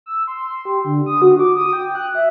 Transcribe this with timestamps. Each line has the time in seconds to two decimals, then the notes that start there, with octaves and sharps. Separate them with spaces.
0.06 E6
0.27 C6
0.65 G4
0.84 D3
1.06 D#6
1.22 F#4
1.39 D6
1.56 D#6
1.73 G5
1.95 F#6
2.15 E5